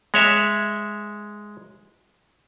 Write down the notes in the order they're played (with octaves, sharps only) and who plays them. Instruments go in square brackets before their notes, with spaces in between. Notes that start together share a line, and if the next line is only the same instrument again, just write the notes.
[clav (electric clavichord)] G#3 C#5 E5